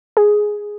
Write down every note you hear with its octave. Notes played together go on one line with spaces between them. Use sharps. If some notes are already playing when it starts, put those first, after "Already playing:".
G#4